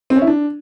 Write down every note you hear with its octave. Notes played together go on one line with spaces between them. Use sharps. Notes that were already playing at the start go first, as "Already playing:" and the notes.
C4
C#4
E4
D4